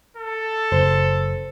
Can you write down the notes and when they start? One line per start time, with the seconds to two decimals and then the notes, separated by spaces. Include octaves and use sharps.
0.17 A4
0.72 F#1 C#3 C5